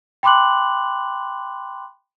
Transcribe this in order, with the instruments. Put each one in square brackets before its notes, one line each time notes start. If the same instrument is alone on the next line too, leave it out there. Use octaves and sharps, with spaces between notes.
[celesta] G5 B5 C6 D6 F#6 F#7